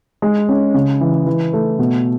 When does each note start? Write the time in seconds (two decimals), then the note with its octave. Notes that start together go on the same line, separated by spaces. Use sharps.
0.22 G#3
0.49 C#4
0.74 C#3
1.01 E3
1.26 E3
1.53 A3
1.79 B2